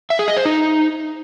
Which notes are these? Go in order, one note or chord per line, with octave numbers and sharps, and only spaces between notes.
E5
G#4
D#5
C5
D#4